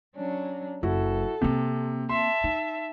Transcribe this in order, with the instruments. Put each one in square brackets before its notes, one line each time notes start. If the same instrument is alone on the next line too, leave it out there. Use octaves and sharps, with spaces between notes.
[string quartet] F#3 C#4 D4
[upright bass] F#1 [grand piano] E4 F#4 [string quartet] A4
[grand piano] C3 [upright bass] A#3 C4
[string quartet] E5 A5 [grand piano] C6
[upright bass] D#4